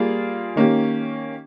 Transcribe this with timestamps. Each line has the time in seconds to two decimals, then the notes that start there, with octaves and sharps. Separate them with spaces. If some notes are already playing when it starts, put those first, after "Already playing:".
Already playing: G3 A#3 F4 G#4
0.56 D#3 A#3 C#4 G4